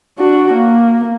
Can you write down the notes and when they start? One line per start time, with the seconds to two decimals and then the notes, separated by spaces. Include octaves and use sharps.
0.19 D4 F#4
0.54 A#3